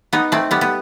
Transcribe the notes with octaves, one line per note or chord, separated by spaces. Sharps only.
B3 D#4
A3 C4
G3 B3
B3